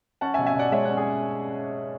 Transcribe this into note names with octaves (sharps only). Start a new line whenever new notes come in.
C#4 F#5 A5
E5 G#5
B2
E5 G#5
B2 D5 F#5
G#3 C#5 E5
C#4 D5 F#5
G#4